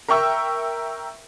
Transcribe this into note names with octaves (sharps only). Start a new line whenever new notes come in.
A#4 E5 G5 C#6 E6